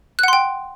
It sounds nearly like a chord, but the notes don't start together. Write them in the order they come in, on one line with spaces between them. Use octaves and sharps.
F#6 F#5 C6 G5